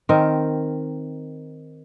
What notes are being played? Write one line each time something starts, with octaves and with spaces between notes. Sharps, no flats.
D#3 C4 A#4